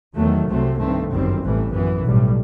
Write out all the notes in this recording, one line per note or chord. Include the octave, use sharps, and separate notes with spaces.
E2 D#3 F#3 A3
C2 C3 F#3 A3 C4
G2 D#3 A3 C4
G1 F#2 D#3 G3 C4
A1 A2 E3 G3
F#2 E3 B3
B1 A2 G3